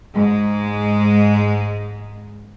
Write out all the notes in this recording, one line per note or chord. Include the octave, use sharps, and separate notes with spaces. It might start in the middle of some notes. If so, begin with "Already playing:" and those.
G#2 G#3